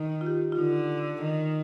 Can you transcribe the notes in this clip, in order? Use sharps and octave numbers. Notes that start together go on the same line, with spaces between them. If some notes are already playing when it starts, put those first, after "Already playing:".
Already playing: D#3
F4
G4
F4
D3 D#4
D#3